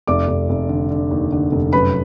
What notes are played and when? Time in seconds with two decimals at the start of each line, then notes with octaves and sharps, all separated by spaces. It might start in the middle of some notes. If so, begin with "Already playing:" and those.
0.07 F1 D5 D6
0.28 F1
0.49 F1
0.69 D3
0.91 D3
1.10 D#2
1.32 D3
1.52 F1
1.73 F#2 B4 B5